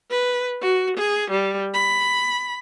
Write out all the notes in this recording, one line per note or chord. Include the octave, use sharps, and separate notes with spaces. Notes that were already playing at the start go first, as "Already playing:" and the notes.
B4
F#4
G#4
G3
B5